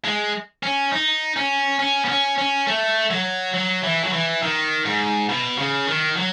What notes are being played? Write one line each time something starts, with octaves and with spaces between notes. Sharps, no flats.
G#3
C#4
D#4
C#4
C#4
B3
C#4
C#4
A3
F#3
F#3
E3
F#3
E3
D#3
G#2
B2
C#3
D#3
F#3